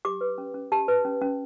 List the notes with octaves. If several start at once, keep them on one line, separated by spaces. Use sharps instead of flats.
G4 D6
B4
C#4
C#4
G4 A5
B4
C#4
C#4